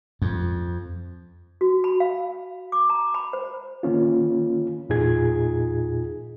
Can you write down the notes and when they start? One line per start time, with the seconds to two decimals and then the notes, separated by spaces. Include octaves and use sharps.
0.22 F2
1.61 F#4
1.84 B5
2.00 F5
2.72 D6
2.90 A#5
3.14 B5
3.33 C5
3.83 D#3 A#3 C#4 F4
4.89 E2 A#2 D#4 F4 G#4 G#6